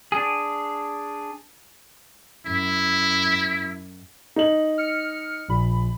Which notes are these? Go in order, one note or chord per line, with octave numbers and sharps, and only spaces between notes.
D4 G#4
F#2 E4
D#4 F#7
F6 C#7
A#1 A#2 B5